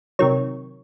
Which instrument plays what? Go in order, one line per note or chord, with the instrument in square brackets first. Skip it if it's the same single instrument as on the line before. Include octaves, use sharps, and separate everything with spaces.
[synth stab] C3 D#3 F#3 C#5